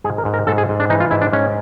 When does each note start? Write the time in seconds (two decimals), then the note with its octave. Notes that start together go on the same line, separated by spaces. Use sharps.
0.04 G#2 G#4
0.18 A#4
0.25 G#2
0.34 A#4
0.47 G#2 A4
0.58 G#4
0.69 G#2
0.80 D4
0.90 E3 D#4
1.00 F4
1.11 G#2 E4
1.21 D4
1.33 G#2 C#4